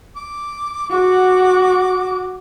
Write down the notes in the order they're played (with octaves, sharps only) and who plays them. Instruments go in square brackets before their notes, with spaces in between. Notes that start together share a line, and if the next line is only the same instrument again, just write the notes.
[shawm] D6
[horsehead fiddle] F#4 [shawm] D6